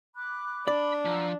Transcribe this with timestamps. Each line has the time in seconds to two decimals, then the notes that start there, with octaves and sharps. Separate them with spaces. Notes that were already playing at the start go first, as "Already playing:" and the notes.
0.16 B5 D6 F#6
0.68 D4 D5 B5 D6
1.05 F3 F#5 A#5 E6